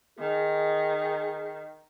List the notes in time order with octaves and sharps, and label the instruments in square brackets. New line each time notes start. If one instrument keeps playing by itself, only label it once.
[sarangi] D#3 [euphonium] G#4